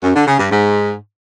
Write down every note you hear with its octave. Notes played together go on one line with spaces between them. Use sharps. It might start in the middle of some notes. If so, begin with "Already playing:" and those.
F#2
D3
C#3
G2
G#2